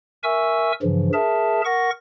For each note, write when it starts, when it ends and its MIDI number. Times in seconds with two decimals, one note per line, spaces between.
0.23 0.72 70
0.23 0.72 76
0.23 0.72 80
0.23 0.72 85
0.23 0.72 88
0.82 1.09 43
0.82 1.09 49
0.82 1.09 52
0.82 1.09 53
1.13 1.61 68
1.13 1.61 70
1.13 1.61 76
1.13 1.61 81
1.65 1.90 70
1.65 1.90 78
1.65 1.90 85
1.65 1.90 94